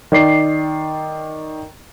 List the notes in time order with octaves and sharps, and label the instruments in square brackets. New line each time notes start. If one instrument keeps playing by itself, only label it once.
[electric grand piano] D#3 D5 C7